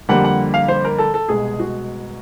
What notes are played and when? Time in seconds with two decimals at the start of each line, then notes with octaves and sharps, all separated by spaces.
0.09 F2 D3 G3 A#3 F#5
0.24 F#5
0.54 F5
0.68 C5
0.85 A#4
0.98 A4
1.14 A4
1.29 C2 B2 G#3 G#4
1.59 F#4